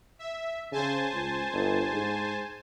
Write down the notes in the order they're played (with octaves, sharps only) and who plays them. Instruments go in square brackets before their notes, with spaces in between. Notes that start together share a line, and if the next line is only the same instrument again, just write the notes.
[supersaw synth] E5
[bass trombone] C#3 [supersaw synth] C5 G#5 A5
[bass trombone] C#2
G1
G#2